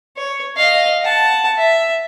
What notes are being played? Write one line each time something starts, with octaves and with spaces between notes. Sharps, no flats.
C#5
D#5 F5
F#5 A5
E5